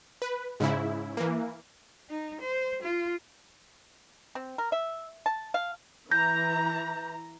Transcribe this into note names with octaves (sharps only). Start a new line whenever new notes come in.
B4
G#2 C#3 E4
E3 A#3
D#4
C5
F4
C4
A#4
E5
A5
F5
E3 A#5 G6 A#6